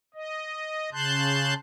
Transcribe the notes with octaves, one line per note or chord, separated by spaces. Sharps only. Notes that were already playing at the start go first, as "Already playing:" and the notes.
D#5
C#3 A5 C6 F#6 G6